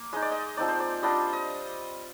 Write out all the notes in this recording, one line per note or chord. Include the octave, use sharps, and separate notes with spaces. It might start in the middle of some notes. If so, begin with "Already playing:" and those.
Already playing: A#3
G#3 D#4 D#5
D5
D#5
F3 C4 D#4 D5
C5
D5
G3 D4 F4 D#5
D#5